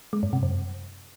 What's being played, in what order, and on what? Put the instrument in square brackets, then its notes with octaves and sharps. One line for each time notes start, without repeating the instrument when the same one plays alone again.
[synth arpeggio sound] G#3
G2
C3
F#2